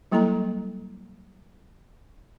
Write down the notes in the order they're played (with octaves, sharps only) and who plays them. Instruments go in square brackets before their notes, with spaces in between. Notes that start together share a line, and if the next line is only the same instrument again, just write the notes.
[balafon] F#3 G3 A#3 E4 A4 A#5